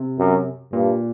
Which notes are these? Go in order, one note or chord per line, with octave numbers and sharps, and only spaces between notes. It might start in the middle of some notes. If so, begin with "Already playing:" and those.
Already playing: C3
F#2
G2 A#2